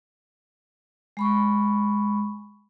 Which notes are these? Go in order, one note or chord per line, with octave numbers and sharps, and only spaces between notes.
G#3 B5 C#6